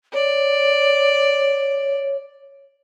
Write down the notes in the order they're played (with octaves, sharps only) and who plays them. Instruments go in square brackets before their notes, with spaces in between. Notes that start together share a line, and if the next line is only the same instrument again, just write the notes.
[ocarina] C#5 [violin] D5